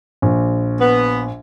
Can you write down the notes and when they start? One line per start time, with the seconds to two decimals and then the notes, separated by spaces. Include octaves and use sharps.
0.22 A#1
0.81 B3